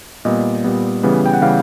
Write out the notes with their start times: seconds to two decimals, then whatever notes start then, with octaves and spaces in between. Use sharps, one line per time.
0.25 A#2 G3 B3 D#5
0.64 A#2 G3 B3
1.03 C#3 E3 G3 B3
1.26 G5
1.34 F#5
1.42 C#3 E3 G3 B3 F5